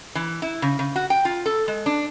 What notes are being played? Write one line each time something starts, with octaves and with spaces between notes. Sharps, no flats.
E3
E4
C#3
C#3
F#4
G5
F4
A4
G#3
D4